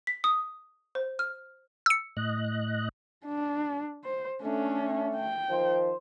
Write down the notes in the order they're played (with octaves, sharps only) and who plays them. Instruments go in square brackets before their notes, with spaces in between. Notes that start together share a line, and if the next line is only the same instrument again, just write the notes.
[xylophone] B6
D#6
C5
F6
[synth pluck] E6 C#7
[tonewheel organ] A2 D#5 F#6
[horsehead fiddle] D4
C5
[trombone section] A3 [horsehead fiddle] C#4 D4
[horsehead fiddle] G5
[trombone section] D#3 F3 C5